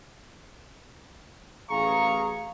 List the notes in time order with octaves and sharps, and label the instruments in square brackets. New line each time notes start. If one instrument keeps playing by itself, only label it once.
[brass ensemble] A1 G#4 F5 [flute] A#5 [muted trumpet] C#6